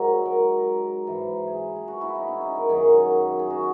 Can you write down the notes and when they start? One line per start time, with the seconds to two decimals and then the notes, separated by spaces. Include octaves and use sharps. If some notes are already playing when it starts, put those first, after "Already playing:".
Already playing: G#2 F#3 D#4 A#4
0.25 A#4
1.07 G#2 E3
1.47 G#4
1.76 G#4
1.88 F#4
2.01 E4
2.15 D#4
2.28 C#4
2.41 D#4
2.55 A#4
2.69 F#2 D#3 F#3 G#4
3.39 G#4
3.50 F#4